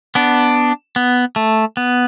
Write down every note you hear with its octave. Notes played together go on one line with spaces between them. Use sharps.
B3 D4
B3
A3
B3